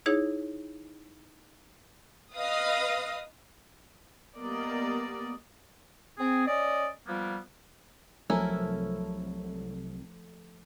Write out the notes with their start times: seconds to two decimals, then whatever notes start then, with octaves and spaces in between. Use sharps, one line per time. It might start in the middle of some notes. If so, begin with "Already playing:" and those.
0.06 D#4 E4 G#4 C#5
2.35 B4 D#5 F5 D#6
4.36 G3 A#3 B3 D5 D#5
6.18 C4 G#4
6.46 C#4 D5 D#5
7.07 F3 G3 A#3 B3
8.30 C2 F3 F#3 A3 C#4 E4 A4 A#4